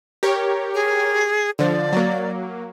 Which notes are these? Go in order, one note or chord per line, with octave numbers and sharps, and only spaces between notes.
G4 A#4 C#5
G#4
D3 F3 D5
F#3 A#3